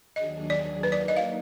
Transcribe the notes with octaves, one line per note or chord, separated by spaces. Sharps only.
D#2 D#3 F#3 D4 G#4 D#5
D5
F#3 A#3 D#4 B4
D5
D#5
F5